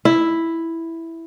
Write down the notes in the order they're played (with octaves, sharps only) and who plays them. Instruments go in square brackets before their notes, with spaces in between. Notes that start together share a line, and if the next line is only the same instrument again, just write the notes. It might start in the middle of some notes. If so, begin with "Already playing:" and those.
[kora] E4